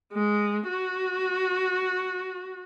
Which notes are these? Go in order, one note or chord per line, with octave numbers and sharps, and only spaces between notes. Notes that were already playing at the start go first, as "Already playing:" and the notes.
G#3
F#4